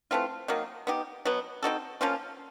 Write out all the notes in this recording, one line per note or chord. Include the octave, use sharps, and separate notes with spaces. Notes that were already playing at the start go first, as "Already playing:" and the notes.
E3 A3 C4 F4
D#3 F#3 A#3 D#4
B3 D#4 G4
B2 F#3 B3
C4 D#4 F#4 A4
F3 A#3 C#4 F4